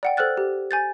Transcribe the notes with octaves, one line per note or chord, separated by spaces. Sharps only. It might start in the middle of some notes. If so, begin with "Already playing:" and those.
D5 F#5 G5
A4 C5 F6 F#6 A6
G4
G#5 G6 A6